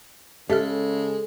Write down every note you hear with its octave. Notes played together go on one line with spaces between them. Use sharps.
C#3 G#3 G4 A4 E5 F6